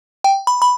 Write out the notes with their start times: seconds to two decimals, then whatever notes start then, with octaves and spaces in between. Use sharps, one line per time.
0.24 G5
0.47 B5
0.62 B5